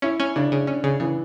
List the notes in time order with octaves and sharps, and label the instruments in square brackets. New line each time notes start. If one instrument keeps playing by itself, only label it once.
[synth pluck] C#4 [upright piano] E4
[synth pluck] C#4
[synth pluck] C#3 [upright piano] D4
[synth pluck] C#3
C#4
C#3
[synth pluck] C#3 [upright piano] E3